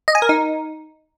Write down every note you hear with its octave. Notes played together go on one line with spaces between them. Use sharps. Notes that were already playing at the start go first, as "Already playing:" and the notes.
D#5
G#5
A#4
D#4